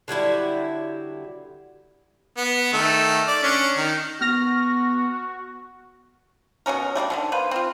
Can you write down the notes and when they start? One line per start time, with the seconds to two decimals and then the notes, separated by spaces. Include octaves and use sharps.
0.08 D3 F#3 G3 E4
2.37 B3
2.73 D#3 A3
3.27 D5
3.43 C#4 D4
3.77 D#3
4.21 B3 F#4 F6 A#6
6.66 B2 F3 C#4 A#4
6.95 G3 A3 A#3 D4
7.10 B2 D3 D#3
7.32 A#3 B4 C5
7.51 C4 F4